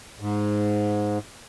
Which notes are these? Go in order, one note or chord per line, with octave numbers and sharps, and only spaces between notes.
G#2